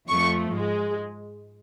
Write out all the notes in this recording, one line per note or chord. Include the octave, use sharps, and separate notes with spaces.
F2 F3 A3 C#6
G#2 G#3